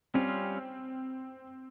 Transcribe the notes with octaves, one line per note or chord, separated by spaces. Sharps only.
G3 C4 C#4 F4